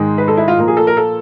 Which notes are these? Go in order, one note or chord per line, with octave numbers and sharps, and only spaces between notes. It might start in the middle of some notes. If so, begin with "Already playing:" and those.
Already playing: G#2 D#3 G#3
B4
A4
E4
F4
A#2 F3 A#3
G#4
A4
A#4
A4